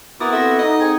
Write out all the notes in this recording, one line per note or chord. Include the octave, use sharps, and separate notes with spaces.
B3 C4 E4 F#4 A#4 D6 D#6 A6
A4 E5 A#6
D#4 D#5
C4 G#4 F#5 G#6